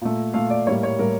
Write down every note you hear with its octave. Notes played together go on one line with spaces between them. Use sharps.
A#2 A3
A#2 A3 F5
D5
A2 G3 A#3 C#5
C#5
A2 G3 A#3 A#4